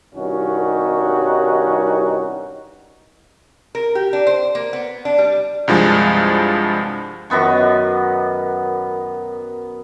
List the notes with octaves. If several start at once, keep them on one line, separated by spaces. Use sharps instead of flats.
C2 G2 D#3 C#4 D#4 F#4
A#4
G4
D4
C5
A#3
B3
D4
G3
C2 G2 F3 G#3
F#2 D#3 B3 C#6